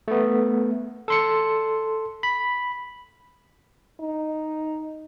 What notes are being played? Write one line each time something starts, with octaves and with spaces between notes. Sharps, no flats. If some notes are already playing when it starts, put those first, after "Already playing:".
A3 B3
A4 C6 C#7
B5
D#4